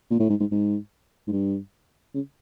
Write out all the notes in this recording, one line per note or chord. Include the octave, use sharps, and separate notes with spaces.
A#2
A2
G#2
G#2
G#2
G#2
G2
C#3